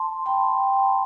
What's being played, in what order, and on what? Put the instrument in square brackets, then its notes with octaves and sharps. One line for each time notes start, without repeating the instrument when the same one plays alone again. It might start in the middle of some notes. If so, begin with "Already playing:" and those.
Already playing: [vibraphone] A5 C6
G5 B5